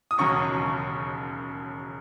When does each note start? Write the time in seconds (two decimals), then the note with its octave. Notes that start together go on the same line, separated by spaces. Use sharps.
0.11 D#6
0.18 E1 D#2 C#3 F#3 C#6